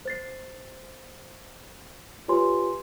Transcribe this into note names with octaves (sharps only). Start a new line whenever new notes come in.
C5 A6 C7
F4 G4 B4 C#5 G#5 C6